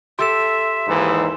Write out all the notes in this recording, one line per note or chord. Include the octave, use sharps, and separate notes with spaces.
G4 A4 E5 C6 E6 E7
D#2 G#2 E3